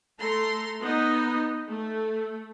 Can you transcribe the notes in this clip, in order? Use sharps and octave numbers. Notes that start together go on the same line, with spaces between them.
A3 A4 A#5 C6
B3 D#4 D#5
A3